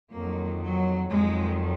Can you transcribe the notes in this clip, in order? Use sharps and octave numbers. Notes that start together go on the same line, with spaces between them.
F2 D#3 F#3 A#3
F#3
F2 D#3 F#3 G#3